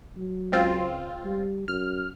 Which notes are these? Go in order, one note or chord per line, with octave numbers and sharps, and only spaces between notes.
F#3
C#2 C4 F4
G3
F#2 F6